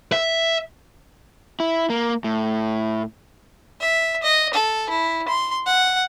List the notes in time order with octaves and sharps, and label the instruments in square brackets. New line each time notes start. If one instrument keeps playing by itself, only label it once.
[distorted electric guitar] E5
[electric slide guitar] E4
A#3
A2
[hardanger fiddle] E5
D#5
A4
E4
C6
F#5